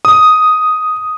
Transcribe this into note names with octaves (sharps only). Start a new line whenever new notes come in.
D#6